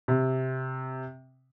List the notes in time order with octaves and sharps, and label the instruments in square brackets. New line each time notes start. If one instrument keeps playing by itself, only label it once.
[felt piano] C3